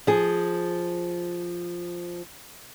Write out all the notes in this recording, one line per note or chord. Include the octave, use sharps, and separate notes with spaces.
F3 G#4